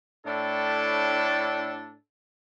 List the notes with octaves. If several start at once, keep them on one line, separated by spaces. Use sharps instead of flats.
A2 D4 A4